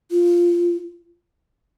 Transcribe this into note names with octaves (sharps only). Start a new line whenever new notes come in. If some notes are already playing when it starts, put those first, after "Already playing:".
F4